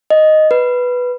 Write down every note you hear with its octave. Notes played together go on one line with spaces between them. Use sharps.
D#5
B4